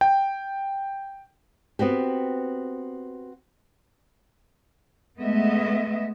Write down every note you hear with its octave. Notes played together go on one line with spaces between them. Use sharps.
G5
B3 C4 F#4 G4
G#3 A3 B3 D#5 E5